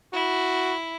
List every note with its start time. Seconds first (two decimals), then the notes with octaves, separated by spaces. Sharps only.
0.13 E4 F#4